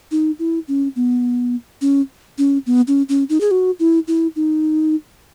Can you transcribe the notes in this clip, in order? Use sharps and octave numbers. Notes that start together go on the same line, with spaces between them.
D#4
E4
C#4
B3
C#4
C#4
B3
C#4
C#4
D#4
G#4
F#4
E4
E4
D#4